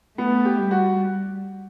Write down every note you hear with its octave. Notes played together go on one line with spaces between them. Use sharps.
A3 B3
G4
G3
F#4